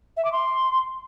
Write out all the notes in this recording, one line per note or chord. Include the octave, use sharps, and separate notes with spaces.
E5
D6
C6